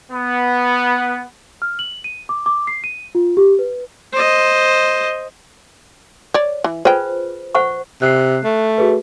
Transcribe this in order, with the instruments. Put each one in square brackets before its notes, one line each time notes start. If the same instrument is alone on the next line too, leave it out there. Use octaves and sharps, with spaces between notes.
[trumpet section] B3
[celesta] F6
F#7
D#7
D6
D6
C7
D#7
F4
G4
B4
[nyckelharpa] C5 D#5
[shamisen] C#5 D5
E3
[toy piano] F4 B4 C5 [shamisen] G#4 G5
[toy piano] C5 F#5 C#6
[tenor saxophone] C3 [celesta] F#6 C7
[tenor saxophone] A3
[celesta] F#4 G#4 B4